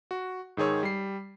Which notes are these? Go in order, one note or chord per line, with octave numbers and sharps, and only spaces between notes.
F#4
G#2 D#3 G#4 C#5 E6
G3 C7